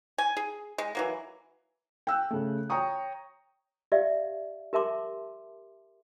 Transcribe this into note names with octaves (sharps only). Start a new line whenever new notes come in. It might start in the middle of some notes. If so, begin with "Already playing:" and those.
G#5
G#4
G#3
E3 F#3 A#3
G5 E6 F#6
C#3 A3
C#5 G5 A#5 C#6 D#6
G4 D5 E5 F5
G4 A#4 E5 A5 C6 D6